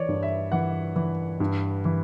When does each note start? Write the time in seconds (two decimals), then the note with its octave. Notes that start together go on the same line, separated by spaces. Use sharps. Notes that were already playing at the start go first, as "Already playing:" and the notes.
Already playing: E3 C#5 D5
0.08 G2
0.23 E5
0.52 E3 F#5
0.96 E3
1.40 G2
1.85 E3